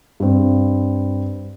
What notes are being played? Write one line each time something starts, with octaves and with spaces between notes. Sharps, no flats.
G2 C4